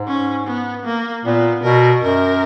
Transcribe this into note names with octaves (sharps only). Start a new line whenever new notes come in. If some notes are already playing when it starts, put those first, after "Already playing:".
Already playing: G#2
C#4
B3
A#3
A#2 B3
B2 A#4
F#2 A#4